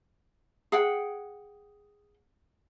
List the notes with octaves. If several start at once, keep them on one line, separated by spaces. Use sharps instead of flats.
G#4 F#5 G5